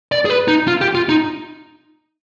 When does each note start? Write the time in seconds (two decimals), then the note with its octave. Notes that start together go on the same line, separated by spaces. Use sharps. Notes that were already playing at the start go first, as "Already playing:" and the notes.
0.12 D5
0.25 G#4
0.30 B4
0.48 D#4
0.67 F4
0.81 G4
0.95 F4
1.09 D#4